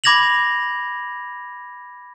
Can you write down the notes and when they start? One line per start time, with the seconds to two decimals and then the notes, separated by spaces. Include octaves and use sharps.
0.04 B5 D6 G#6 A#6 F7 F#7